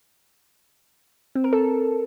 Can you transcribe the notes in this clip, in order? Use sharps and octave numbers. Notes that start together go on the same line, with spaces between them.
C4
A#4
A4